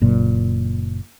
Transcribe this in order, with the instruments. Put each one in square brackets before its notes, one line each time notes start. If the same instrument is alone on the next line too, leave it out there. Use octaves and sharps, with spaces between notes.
[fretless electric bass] F#1 A#2